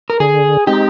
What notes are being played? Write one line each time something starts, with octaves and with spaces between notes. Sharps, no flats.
A#4
D3 G#4
G#3 C4 D#4 G4